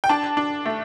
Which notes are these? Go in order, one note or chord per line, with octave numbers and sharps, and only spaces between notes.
G5
D4 A5
D4
A3